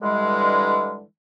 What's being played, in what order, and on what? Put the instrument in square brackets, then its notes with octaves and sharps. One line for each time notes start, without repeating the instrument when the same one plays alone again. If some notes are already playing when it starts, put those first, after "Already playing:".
[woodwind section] G2 D3 E3 G3 G#3